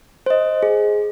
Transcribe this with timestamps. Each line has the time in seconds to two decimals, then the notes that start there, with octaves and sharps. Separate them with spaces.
0.26 C5 D#5
0.63 G#4